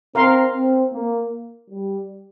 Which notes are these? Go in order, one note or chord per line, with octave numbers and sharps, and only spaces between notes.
C4 A#4 F5 C6
C4
A#3
G3